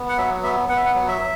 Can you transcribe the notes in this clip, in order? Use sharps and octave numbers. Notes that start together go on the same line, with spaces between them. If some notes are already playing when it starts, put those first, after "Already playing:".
Already playing: B3
F#5
F#3 E5
B3 E5
B3 F#5
E5
F#5
F#3
E5